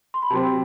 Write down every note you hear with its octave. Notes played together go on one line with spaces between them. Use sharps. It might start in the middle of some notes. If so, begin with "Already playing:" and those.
C6
B5
C3 F#3 C4 A5